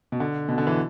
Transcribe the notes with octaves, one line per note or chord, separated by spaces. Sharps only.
B2
D3
B2
D3
E3